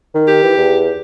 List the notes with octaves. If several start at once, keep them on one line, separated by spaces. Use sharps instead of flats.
D#3
G4
E3
E2